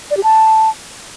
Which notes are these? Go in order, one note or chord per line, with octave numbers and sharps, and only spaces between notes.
D5
G4
A5